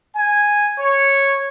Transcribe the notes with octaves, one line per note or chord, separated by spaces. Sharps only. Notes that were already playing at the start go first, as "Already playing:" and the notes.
G#5
C#5